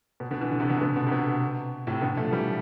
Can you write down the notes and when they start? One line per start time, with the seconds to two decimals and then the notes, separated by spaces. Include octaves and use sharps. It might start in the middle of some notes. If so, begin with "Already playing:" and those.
0.20 B2
0.31 B2 D3
0.41 E3
0.51 D3
0.60 C3
0.70 B2 D3
0.81 B2 D3
0.96 B2 D3
1.07 C3
1.12 B2
1.87 A2 C3
2.01 B2 D3
2.17 F3 A3
2.32 E3 G3